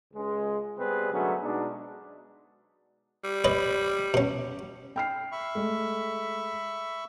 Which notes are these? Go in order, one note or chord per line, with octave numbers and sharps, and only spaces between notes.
C#2 G#3
C3 G3 B3 C4 G#4 B4
D3 F#3 G#3 A3 B3 C#4
B2 G#3 D4 D#4
G3
B4 C#5 D#5
B2 C#4
G5 F6 C7
E5 B5 C#6
G#3 A3